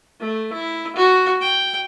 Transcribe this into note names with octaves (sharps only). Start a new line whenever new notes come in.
A3
E4
F#4
G5